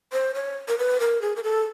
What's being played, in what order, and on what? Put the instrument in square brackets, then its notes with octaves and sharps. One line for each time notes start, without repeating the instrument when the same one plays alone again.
[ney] C5
C#5
A#4
B4
A#4
G#4
A#4
A4